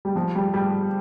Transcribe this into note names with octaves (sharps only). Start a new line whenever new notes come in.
G3
F3
G3
G3